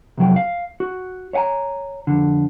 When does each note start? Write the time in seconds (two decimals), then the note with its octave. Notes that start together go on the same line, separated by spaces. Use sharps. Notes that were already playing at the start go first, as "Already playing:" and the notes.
0.18 C2 F2 F#3 G5
0.36 F5
0.80 F#4
1.33 C#5 E5 F#5 G#5 A#5
2.07 F2 D3